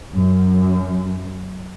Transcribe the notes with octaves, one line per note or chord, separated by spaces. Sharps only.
F#2